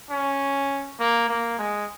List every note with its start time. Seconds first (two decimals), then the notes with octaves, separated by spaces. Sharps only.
0.10 C#4
0.99 A#3
1.28 A#3
1.58 G#3